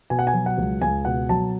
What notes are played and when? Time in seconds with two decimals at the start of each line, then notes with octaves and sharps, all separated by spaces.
0.10 B2 G#5
0.19 F#5
0.27 G#5
0.34 F#3
0.46 F#5
0.58 C#2
0.82 C#2 G#5
1.05 B2 F#5
1.29 F#3 A5